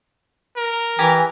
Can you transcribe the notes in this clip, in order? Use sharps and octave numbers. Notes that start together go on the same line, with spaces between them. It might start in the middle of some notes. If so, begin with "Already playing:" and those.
A#4
E3 G4 G#5 A#5